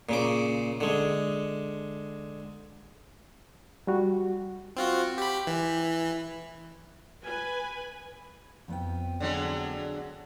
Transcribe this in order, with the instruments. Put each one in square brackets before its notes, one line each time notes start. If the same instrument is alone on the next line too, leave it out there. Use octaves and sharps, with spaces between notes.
[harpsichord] A#2 C#3 D6
D3 G#3
[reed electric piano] G3 F#4
[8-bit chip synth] C4 F4 F#4
G4 B5
E3
[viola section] B4 G#5
[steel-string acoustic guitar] F2 B3 G5
[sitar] D3 F#3 G#3